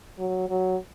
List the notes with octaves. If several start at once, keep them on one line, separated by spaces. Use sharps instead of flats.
F#3
F#3